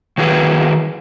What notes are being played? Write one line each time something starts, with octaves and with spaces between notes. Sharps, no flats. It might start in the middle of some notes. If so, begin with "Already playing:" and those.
D#3 E3 F#3 G#4 B4